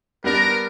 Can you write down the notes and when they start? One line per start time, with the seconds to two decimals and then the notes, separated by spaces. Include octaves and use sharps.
0.24 G3 B3 D4 A#4